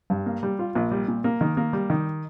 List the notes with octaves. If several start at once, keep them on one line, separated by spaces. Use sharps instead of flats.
G2
A#3
G3
F4
A#1
G3
A#2
A#3
D#3
A#3
G3
D#3